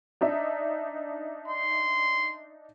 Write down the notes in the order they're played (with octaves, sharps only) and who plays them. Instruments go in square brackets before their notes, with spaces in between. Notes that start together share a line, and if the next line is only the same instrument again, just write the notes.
[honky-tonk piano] D4 D#4 E5
[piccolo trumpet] C6